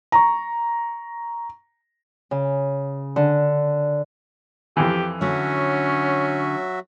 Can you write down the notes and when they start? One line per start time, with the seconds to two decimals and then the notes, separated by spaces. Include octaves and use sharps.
0.12 A#5 C#6
2.31 C#3
3.16 D3
4.77 F2 E3 G4
5.21 D3 F#3 A3 C#4 F#4 E5